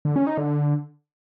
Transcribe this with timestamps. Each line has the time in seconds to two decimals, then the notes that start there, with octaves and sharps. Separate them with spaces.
0.05 D3
0.16 C#4
0.27 D#4
0.38 D3